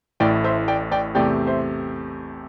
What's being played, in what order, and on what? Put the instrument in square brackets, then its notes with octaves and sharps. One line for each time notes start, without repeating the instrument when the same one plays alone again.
[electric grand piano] A1 A2 A3 E4 [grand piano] D5 G5
[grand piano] C5 E5
D5 G5
D5 G5
[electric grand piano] E2 C3 A3 C4 G4 [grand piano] D5 G5
[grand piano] C5 E5